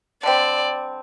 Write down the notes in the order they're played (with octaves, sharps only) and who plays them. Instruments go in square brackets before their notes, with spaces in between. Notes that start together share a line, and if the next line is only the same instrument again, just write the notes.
[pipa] D3 G3 C4 [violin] D5